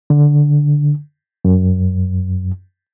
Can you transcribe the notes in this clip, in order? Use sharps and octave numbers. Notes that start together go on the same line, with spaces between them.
D3
F#2